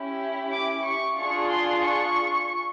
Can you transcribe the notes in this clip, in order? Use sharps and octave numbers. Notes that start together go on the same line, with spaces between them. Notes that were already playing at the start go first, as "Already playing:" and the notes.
Already playing: C#4 E4 G4
D6
C#6
D4 F4 G#4 C#6
C6
C#6